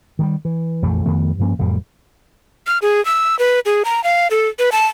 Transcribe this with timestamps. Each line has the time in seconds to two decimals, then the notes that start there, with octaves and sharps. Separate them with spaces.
0.19 D#3 F#3 G3
0.45 E3
0.82 A#1 F2 E3 A3
1.06 F2 D#3 A3 B3
1.39 G2 F3 A#3 C#4
1.59 F#1 F2 A2 G3
2.67 F6
2.82 G#4
3.05 E6
3.39 B4
3.66 G#4
3.85 A#5
4.04 F5
4.31 A4
4.59 B4
4.72 A5